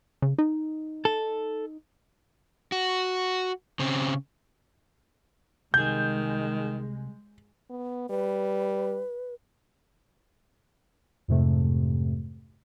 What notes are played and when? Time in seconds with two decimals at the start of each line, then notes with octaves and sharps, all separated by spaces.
0.22 C#3
0.39 D#4
1.05 A4
2.72 F#4
3.79 C#3 C4
5.74 C2 D#3 G#3 G#4 G6
7.70 B3
8.10 G3 B4
11.28 F2 G#2 C3 A3